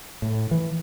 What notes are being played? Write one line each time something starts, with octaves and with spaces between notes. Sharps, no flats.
A2
E3